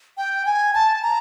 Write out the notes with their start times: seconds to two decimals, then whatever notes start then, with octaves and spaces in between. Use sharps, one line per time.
0.17 G5
0.46 G#5
0.74 A5
1.02 A#5